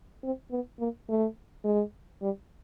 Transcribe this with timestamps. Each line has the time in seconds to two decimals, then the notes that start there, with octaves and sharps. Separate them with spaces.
0.24 C4
0.51 B3
0.80 A#3
1.09 A3
1.64 G#3
2.22 G3